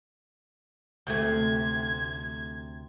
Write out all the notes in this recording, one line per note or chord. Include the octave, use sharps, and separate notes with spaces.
D2 C3 A3 G#6